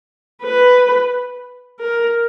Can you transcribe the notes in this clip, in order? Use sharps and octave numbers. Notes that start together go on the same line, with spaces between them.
B4
A#4